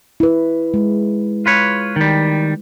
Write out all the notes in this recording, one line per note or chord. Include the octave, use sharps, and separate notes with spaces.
E4 B4
G#3
F4 B4 C#5
D#3 G3